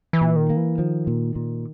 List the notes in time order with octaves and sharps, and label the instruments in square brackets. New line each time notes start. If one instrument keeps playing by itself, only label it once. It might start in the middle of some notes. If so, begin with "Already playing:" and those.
[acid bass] E3
[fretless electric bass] A#2
[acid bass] D#3
[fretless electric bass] A#3
[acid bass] E3
[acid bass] D#3 [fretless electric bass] F3
[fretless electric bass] A#2
A#2